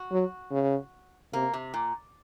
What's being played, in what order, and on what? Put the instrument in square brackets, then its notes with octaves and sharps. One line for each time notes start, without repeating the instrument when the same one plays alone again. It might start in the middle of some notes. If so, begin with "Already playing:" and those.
Already playing: [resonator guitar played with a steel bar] F#4
[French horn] F#3
C#3
[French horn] C3 [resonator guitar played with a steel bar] A#3
[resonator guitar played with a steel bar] C3
A#2